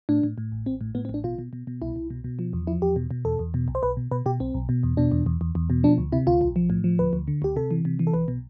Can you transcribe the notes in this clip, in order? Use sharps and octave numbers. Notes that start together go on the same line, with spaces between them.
A2 D4
A2
A2
A1
A1 C4
A2
A2 B3
C4
A1 D4
B2 F4
B2
B2
B2
C2 E4
C2
B2
B2
F3
E2
F3 E4
E2 G4
B2
B2
E2 A4
E2
B2
B1
C5
B1 B4
B2
B2 B4
B2 G4
B1 C4
B1
B2
E2
B2 D4
E2
E2
E2
E2
B2
F3 D4
D2
C3 E4
D2 F4
B1
F3
A2
F3
D2 B4
D2
D3
D2 G4
C3 A4
E3
C3
E3
A4
B1 B4
B2